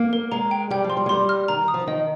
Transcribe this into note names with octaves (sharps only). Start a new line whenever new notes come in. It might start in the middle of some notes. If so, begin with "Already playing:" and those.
Already playing: A#3
A#4
G#3 A#5
G5
G3 G5
F3
C6
G3
G#3
G3 C6
F6
D#3 A#5
D#6
F3
D#3 D#5